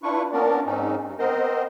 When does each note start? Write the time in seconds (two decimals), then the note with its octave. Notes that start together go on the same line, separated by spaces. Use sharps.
0.03 D4 E4 F4 B4 C#6
0.33 A#3 B3 C#4 D4 A#4 D5
0.66 G#2 C4 C#4 D#4
1.05 G2
1.19 B3 C4 A#4 C5 D#5